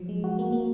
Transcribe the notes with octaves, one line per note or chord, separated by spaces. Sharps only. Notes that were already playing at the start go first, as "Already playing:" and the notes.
Already playing: F3 F#3
G#3
F#4
A#3
A#3